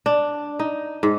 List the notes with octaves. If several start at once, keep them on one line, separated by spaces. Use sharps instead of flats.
D4
D#4
G#2